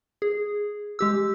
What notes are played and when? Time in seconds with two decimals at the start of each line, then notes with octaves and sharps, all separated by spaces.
0.22 G#4
0.99 G#3 G4 E6